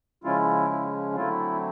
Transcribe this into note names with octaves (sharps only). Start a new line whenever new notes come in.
C#3 F3 G#3 C#4 E4 F4
E4
D3 F#3 A3 C4 E4 F4